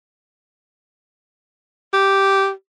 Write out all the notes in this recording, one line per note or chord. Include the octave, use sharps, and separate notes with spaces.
G4